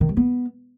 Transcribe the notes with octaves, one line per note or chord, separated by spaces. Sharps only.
D#3
G3
B3